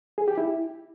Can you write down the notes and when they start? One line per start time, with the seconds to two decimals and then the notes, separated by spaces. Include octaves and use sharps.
0.18 G#4
0.28 G4
0.38 E4